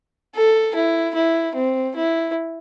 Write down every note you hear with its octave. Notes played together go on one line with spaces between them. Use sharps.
A4
E4
E4
C4
E4